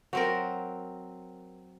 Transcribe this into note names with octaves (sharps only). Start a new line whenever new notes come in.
F#3 C4 A#4